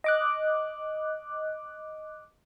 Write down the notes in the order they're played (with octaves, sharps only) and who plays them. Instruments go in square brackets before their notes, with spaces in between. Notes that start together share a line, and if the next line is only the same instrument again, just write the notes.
[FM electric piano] D#5 D6 F#6